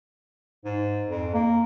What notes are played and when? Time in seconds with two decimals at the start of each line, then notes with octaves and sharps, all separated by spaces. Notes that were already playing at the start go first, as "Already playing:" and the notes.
0.65 G#2
1.08 F2
1.34 A#3